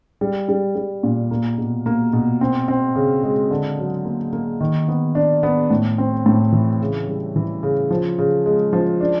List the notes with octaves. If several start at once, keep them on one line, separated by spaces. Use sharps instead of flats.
G3
G3
G3
A#2
A#3
B2
A#3
B2
C4
C4
C#3
G#3
D3
F#3
A#3
A#3
D#3
B3
D4
B3
A2
C4
A2
E3
C#3
G3
E3
C#3
F3
C#3
G#3
F3
D4